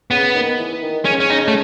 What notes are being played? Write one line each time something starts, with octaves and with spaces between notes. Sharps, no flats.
C#3 B3
D#3
E3
D#3
C#3 C#4
C#4
D#4
A3